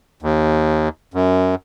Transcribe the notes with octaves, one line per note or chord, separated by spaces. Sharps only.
D#2
F#2